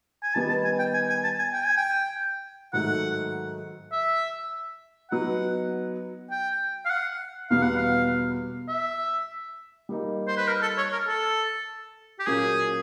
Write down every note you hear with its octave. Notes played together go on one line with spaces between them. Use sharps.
G#5
D#3 G3 B3 D#4 A5
A5
G#5
G5
G#5
G#5
A5
G#5
G5
G#5
G5
G#2 D#3 F#3 A3 F#5
E5
F#3 B3 D#4 F#5
G5
F5
F#5
E2 B2 G3 B3 F5
F#5
F5
E5
G3 A#3 D#4
C5
B4
A#4
A4
C#5
A#4
A4
G4
A#2 F#3 A#3 C#4 G#4